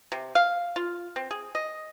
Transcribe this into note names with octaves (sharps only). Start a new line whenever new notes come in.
C3
F5
F4
C4
G#4
D#5